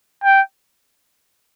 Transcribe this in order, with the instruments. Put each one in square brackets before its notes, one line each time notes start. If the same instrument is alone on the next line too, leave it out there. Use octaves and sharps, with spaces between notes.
[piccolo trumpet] G5